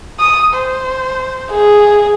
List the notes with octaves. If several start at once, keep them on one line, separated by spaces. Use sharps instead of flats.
D#6
C5
G#4